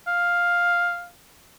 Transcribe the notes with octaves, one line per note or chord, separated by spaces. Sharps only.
F5